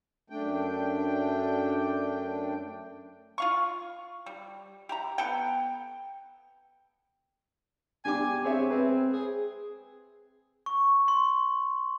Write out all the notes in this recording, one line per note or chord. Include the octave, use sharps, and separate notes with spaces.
F#2 A3 D4 G5
F4 F5 C#6
G3
G4 E5 A#5
B3 A4 G5
D4 G4 G#5 D6
C4 G#4 C#5 E5
C4 B4
G#4
C#6
C6